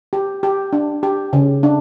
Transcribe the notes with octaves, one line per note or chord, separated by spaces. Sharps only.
G4
G4
D4
G4
C#3
D4